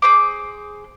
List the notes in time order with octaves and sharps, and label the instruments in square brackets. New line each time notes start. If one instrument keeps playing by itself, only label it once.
[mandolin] G#4 C5 D6